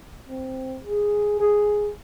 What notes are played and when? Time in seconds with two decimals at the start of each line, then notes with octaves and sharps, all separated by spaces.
0.28 C4
0.84 G#4
1.40 G#4